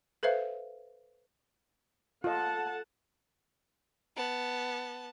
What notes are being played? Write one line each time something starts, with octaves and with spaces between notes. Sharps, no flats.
A4 B4 C5 E5 F5
F4 A4 D#5 F#5 A5
B3 A5